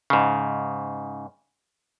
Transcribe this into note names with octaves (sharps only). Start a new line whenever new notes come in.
G#2 C#3